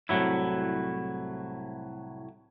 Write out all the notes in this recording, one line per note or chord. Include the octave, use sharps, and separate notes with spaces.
C2 F2 A2 F#3 E4